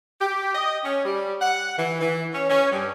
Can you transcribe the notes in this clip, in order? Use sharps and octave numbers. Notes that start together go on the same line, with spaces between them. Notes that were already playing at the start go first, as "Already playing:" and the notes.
G4
D#5
C#4
G3
F#5
E3
E3
C#4
C#4
G2